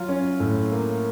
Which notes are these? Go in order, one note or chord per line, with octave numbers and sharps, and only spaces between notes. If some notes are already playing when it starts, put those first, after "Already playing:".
Already playing: F#3 F4
C#4
A2
A#3